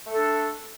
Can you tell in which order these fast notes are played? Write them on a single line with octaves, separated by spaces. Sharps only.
A3 A4 D4